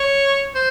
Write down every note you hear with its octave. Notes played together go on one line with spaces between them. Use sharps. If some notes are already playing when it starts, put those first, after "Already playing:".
Already playing: C#5
C5